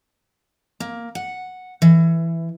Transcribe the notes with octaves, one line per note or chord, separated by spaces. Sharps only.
A#3
F#5
E3